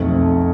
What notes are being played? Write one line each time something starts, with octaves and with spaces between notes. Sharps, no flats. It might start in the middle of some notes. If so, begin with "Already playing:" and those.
Already playing: B1 F2 A3